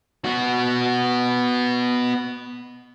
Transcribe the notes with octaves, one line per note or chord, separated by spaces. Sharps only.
B3 F#4